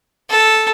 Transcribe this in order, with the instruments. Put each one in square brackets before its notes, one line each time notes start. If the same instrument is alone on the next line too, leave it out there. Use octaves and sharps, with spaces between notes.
[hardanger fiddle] A4